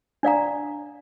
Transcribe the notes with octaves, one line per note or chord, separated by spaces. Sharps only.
D4 D5 F5 A#5